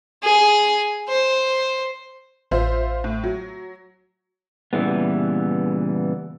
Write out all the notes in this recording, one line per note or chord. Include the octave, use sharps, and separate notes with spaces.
G#4
C5
A1 F4 C5 E5
A2
F#3
A#2 C#3 E3 G3 B3